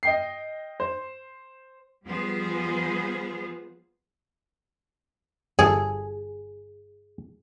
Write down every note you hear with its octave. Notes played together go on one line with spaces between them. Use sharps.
D#5 G5 C7
C5
F3 G3 B3 F4 G#4 C5
G1 G#4 A4